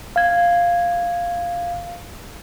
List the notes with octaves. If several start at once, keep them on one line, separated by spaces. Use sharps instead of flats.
F5 G#6